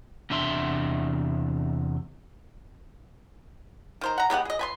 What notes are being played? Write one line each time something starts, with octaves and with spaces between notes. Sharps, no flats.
E2 C3 D4 E5 C6
D#3 C5 A#5
F#5 A#5
G#3 B3 G4 F#5
G#4 D#5
B4 G#5 C6